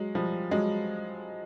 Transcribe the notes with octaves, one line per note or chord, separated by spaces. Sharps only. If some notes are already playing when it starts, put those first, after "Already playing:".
Already playing: F#3 G#3
F3 G3
F#3 G#3